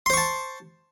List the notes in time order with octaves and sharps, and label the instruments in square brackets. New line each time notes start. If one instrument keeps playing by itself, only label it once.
[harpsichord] C6
C5
C#6
A5